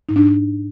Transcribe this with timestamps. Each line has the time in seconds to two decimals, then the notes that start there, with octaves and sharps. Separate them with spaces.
0.09 G#2 D#4
0.16 D4